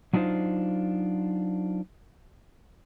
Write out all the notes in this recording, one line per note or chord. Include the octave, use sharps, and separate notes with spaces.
F#3 D4 D#4 F4 C5 F5